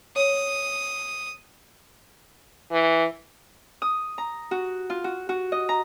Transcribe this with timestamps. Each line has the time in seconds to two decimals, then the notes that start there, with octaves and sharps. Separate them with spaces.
0.16 C#5 D#6
2.71 E3
3.82 D#6
4.18 A#5
4.51 F#4
4.90 F4
5.04 F#4
5.29 F#4
5.52 D#5
5.69 A#5